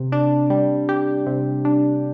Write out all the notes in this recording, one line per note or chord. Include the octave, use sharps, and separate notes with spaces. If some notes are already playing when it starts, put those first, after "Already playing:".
Already playing: C3
D4
G3
G4
C3
D4